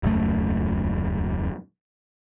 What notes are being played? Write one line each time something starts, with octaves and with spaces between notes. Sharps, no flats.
D#1 C#2 F#2 A3